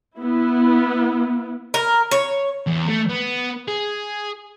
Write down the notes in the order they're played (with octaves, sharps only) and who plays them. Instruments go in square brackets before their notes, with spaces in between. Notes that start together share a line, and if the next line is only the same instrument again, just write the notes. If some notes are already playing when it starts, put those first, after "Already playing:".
[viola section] B3 E4
[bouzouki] A#4
C#5
[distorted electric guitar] E2
A3
B3
G#4